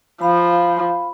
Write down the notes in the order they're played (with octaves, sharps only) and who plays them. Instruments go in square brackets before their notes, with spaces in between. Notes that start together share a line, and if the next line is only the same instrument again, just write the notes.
[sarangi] F3 [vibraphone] F5 B5